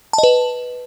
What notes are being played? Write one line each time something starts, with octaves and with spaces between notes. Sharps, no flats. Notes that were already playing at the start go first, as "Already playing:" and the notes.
A5
D#5
B4